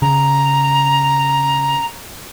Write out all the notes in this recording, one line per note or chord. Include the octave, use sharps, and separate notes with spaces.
C#3 A#5